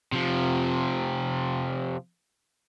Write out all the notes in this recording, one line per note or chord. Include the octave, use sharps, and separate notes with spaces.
C3 F3